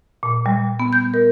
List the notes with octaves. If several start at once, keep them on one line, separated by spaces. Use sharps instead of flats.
A#2
G3
B3
G6
A#4